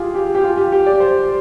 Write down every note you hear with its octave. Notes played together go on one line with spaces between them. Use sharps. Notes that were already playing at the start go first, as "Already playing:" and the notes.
Already playing: F4 G4 G#4
G4
G4
F4
G4
G4
D5
C5